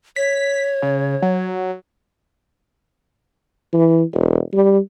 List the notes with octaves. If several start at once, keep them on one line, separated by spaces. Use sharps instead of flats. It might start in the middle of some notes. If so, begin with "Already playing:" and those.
C#5 B6
C#3
F#3
E3
E1
G3